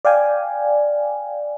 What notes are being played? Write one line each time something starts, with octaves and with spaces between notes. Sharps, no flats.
D5 F5 G5 G#5